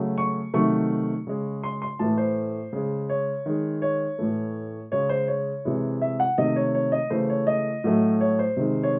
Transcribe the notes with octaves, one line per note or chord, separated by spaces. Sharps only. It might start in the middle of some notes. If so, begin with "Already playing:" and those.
Already playing: C#3 F#3 A3
C#6
C3 D#3 F#3 A3 C#6
C#3 G#3
C6
C6
A2 E3 A3 A5
C5
C#3 G#3
C#5
D#3 G#3
C#5
A2 E3 A3
C#3 G#3 C#5
C5
C#5
C3 E3 G#3
E5
F#5
C3 D#3 A3 D#5
C#5
C#5
D#5
C#3 E3 A3 C5
C#5
D#5
A2 F#3 A3
C#5
C5
C3 D#3 G#3
C#5